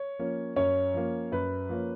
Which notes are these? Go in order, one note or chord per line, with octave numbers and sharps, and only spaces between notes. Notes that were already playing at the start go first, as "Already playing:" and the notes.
Already playing: C#5
F3 A#3 C#4
F#2 C#4 C#5
F3 A#3 C#4
F#2 B4
F3 A#3 C#4